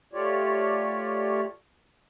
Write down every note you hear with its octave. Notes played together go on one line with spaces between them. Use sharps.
A3 F4 G4 C#5 D5